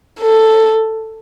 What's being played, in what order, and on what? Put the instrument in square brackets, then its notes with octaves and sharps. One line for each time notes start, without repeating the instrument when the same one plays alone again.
[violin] A4